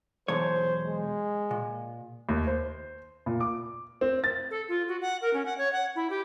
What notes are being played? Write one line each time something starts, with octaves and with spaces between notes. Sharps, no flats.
B1 E2 C5 C#5
G#3
A#2
D#2
C5
A#2
D6
C4
A6
A4
F4
F#4
F#5
A#4
C#4
F#5
C#5
F#5
E4
G4